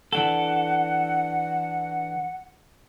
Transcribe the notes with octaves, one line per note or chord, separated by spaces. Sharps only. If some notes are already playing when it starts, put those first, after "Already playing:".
E3 D4 A4 F#5